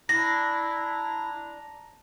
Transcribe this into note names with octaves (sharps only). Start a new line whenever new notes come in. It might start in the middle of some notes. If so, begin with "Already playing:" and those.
D4 E4 A#5 A#6